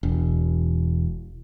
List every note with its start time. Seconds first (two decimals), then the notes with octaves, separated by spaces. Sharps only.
0.03 E1